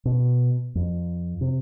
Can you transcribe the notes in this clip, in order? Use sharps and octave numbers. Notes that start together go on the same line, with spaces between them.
B2
F2
C3